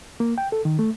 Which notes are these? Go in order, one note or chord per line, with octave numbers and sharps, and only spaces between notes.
A#3
G5
A4
D#3
A3